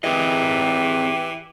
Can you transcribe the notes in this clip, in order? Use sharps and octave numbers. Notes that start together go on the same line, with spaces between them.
E3 C4 G4 G#4 D#5